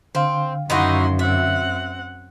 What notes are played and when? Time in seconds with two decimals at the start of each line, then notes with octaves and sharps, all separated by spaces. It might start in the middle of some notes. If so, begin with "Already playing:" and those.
0.15 D3 C4 F5
0.70 F#2 D#3 D#4 E4 F#4 C6
1.19 C4 E5 F#5